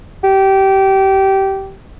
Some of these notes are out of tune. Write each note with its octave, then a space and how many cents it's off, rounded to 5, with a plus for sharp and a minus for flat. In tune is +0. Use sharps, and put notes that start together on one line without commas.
G4 -20